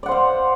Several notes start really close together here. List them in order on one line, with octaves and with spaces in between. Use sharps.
D5 F#5 C5 F5